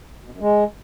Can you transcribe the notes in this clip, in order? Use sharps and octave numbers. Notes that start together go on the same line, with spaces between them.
B2
F#2
G#3